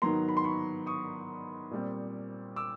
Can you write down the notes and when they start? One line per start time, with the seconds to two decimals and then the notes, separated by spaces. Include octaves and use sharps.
0.02 G#2 D#3 F#3 B3 A#5 C6
0.29 B5
0.37 C6
0.44 B5 C#6
0.86 C#6 D#6
1.71 A#2 G3 C4
2.56 D6 E6